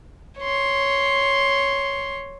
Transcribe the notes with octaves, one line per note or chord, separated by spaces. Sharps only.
C#5 C6